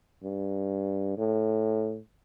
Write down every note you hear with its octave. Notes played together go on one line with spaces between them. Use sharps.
G2
A2